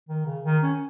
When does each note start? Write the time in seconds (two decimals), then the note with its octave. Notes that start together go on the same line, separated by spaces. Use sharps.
0.09 D#3
0.26 C#3
0.45 D#3
0.63 C#4